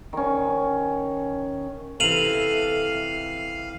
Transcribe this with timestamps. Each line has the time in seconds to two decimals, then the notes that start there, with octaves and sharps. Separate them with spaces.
0.13 D#3 C#4
2.00 C3 E3 A4 F5 D#7 F7 F#7